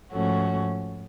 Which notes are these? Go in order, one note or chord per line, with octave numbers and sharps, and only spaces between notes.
G#2 F3 A3 C#4 F#4